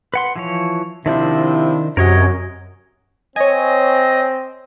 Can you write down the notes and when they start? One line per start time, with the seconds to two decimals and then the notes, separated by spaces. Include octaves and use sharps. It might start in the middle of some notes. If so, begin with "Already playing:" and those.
0.14 B4 F#5 C6
0.36 E3 F3 C#5
1.06 C3 D#3 F3 D4 E4 C5
1.97 F#2 C3 F#4 A#4 C#5 D#5
3.36 C4 C#5 D#5 G#5